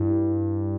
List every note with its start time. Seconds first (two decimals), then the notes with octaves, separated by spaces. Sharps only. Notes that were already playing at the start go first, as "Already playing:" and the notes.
Already playing: G2 E4